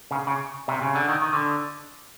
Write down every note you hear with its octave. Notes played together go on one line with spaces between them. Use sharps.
C#3
C#3
C3
C#3
D3
D#3
D#3
D3